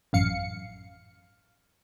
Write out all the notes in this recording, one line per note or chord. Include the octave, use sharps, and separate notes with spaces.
A1 F#2 F5 C#7